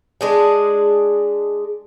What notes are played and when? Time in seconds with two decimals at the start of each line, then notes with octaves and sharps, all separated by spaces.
0.21 G#3 D4 G#4